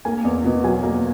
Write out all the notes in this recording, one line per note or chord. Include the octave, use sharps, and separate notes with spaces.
A#3 G#5
E2
B2
F#3 G#5
A#3